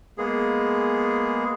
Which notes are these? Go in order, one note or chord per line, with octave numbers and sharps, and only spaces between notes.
G#3 A#3 B3 G#4